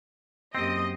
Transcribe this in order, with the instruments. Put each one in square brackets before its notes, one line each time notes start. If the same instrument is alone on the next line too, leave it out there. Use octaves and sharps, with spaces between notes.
[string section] F#2 D#5 [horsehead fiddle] A#3 G4 [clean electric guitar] C4